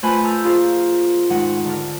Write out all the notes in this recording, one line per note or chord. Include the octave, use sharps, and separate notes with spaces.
A3 F4 B4 C5 G#5 B5
A4 A#5 E6 G6
F4 G#4 A#4 C5
G#2 D#3 G#3 D#4 F#5
D3 A#4